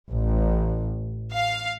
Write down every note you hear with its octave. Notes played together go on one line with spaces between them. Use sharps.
A1
F5